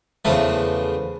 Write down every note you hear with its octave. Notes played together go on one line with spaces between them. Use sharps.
E2 C#3 F3 A3 B4